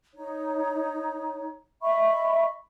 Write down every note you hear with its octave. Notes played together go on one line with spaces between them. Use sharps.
D#4 C#5
D#5 E5 B5 C#6